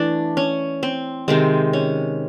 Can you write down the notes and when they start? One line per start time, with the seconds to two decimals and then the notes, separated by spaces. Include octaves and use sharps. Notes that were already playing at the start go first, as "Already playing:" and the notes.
Already playing: E3 A3 D4
0.37 C#4
0.83 C4
1.28 C3 D#3 G#3 C4
1.73 C#4